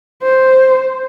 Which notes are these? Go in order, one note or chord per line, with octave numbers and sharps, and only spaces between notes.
C5